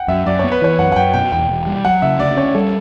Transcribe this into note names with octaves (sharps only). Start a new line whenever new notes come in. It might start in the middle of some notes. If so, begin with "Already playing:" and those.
Already playing: F#5 G5
F#2 E5
F#2 D5
B3 C#5
B4
E3 C#5
F#2 F#5
F#5
F#2 G5
B2 G5
E2 G5
E1
G3
F#3 F#5
C#3 E5
D2 D5
C#4 C#5
G3 A4